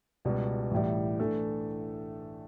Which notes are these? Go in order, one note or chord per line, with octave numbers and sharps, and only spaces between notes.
C#2 B2 G3
A1 A2 G3
E3 A3 D4 A4